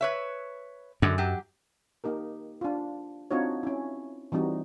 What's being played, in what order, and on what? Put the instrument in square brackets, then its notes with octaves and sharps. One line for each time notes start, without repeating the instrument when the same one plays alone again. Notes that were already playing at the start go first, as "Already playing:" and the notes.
[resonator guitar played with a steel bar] B4 C#5 E5
[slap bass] F#2 [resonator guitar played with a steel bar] D3 G#3
[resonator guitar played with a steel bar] F#3 G4
[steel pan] A#3 D#4 G4 A#4
D4 F4
C4 D4 D#4 F4 F#4 C#5
C#4 E4
E3 G3 C4 D#4 F#4